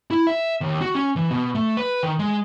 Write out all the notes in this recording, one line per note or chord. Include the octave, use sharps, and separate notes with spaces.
E4
E5
D#2
F#4
C#4
E3
B2
A3
B4
D#3
G#3